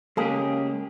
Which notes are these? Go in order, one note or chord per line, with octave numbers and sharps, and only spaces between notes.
C#3 G#3 A#3 G4 G#4